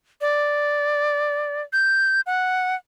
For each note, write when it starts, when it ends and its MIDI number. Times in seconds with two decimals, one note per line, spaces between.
0.21 1.62 74
1.73 2.21 91
2.26 2.75 78